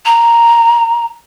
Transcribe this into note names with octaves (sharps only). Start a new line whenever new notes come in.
A#5